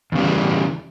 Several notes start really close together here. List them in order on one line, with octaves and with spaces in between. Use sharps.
E2 C#3 G3 E3